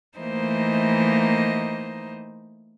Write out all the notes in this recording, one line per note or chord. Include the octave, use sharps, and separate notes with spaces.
E3 A3 A#3 D#4 C5 D#5